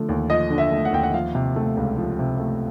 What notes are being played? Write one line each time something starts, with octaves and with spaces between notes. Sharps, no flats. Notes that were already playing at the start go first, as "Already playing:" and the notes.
Already playing: D3 F3 A3
D#2
F3 D#5
D3
E5
A3
F#5
D#2 G5
F#5
F3 F5
C3
A3
C#2
F3
C3
A3